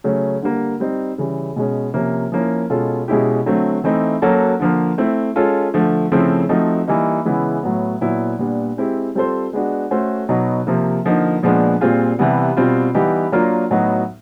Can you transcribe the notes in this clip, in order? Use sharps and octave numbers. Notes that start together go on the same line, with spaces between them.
C#3 F#3 A3 C#4
D3 G3 A#3
G3 C4 D#4
C#3 E3 G3
B2 G#3 C#4
C3 F3 A#3 C#4
F3 A#3 C#4 E4
B2 G#3 C#4 F4 A4
B2 G#3 C#4 E4 G4
D3 F#3 A3 C4
E3 A3 C4 D#4
F#3 A#3 C#4 F#4 A4
D3 F3 A#3
A3 C4 E4
G#3 C#4 F4 A4
D3 F3 A3
C#3 F3 A3 C4 E4
F3 A3 C4 D#4 F#4
E3 G3 A#3 D#4
C#3 E3 G#3 B3 E4
A2 F#3 B3
A#2 F#3 B3 E4
A#2 G3 B3 D4
G#3 C4 E4 G4
G3 C4 F4 A4 C5
G#3 B3 D4 F#4
A3 C#4 F#4 A4 C5
B2 F#3 B3 D#4
C3 F3 A#3
D3 F3 A#3 D#4
A#2 F3 G#3 B3 D4
A#2 G3 C4 F4 G#4
C3 E3 G3 B3
B2 G3 C4 F4
E3 G3 B3 D#4 G4
F#3 A#3 D4 F4 A#4
A2 F#3 B3 D#4 F#4